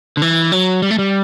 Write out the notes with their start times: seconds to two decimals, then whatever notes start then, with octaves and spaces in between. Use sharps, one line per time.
0.17 D3
0.22 E3
0.52 F#3
0.82 G3
0.91 A3
0.99 G3